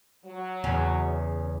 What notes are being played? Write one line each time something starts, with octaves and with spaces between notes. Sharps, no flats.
F#3
E2 C#3